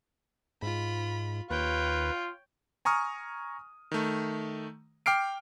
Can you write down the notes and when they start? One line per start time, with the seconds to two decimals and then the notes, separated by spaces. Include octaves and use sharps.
0.62 G#2 F4 B5
1.50 D#2 F4 B4 C#5 G5
2.85 G#5 A#5 C#6 D#6 F6
3.91 D#3 A3
5.06 G5 D6 F6 C7 D7